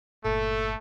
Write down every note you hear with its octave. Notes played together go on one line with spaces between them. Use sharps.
G1 A#2 A3 A4